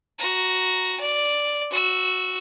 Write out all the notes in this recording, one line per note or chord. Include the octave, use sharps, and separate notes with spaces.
F#4 A#5
D5
F#4 E6